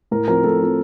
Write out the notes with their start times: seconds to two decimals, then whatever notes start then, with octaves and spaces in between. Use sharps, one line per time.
0.11 A2 A#4
0.28 F3 C4 A#4
0.44 A2 A4
0.60 F3 C4